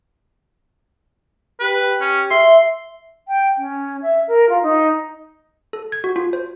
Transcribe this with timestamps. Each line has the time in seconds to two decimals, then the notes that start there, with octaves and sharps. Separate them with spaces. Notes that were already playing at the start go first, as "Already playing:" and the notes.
1.60 G4 B4
2.01 C#4
2.31 E5 C6
3.28 G5
3.58 C#4
4.02 E5
4.28 A#4
4.49 F4
4.62 D#4
5.73 A4
5.92 G#6
6.04 F#4
6.16 F4
6.33 C5